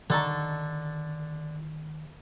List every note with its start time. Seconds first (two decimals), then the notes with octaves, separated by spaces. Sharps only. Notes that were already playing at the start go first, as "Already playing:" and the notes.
0.10 D3 D#3 A4 A#5 C#6